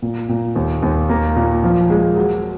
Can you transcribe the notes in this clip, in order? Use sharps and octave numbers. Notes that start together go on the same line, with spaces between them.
A#2
A#2
D#2
D#2
A#3
A#2
F3
G#3
F#3